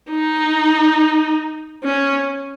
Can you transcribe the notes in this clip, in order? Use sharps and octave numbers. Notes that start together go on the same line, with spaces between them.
D#4
C#4